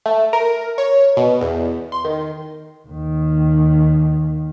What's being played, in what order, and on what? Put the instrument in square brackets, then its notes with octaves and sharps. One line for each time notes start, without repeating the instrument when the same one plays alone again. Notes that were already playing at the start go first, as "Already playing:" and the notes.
[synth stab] A3
A#4
C#5
B2
E2
C6
D#3
[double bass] D#2 D#3